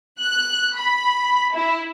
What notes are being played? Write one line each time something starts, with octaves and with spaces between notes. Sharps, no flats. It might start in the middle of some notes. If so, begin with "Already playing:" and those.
F#6
B5
E4